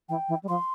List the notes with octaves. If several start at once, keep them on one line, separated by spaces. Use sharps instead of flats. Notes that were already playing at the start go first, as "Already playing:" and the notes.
E3 G5
E3
G3
F3 C6